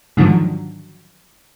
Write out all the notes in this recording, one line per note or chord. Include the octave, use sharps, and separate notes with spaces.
G#2 D3 D#3 F3 F#3